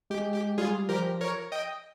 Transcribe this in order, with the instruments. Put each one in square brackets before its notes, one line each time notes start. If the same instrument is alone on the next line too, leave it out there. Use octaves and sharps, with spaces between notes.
[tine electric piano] G#3 [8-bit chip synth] G4
[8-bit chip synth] G4
[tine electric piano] G3 [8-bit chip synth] F4 G#4
[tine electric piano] F3 [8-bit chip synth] G4 A#4
[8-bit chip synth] A#4 C#5
D#5 G5